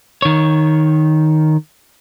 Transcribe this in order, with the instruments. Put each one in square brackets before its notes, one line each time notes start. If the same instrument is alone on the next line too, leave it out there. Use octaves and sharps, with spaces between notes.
[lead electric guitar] D#3 C#5